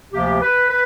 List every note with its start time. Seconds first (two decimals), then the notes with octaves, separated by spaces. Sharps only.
0.13 D2 C3 F3 A#3 G4
0.42 B4
0.70 B4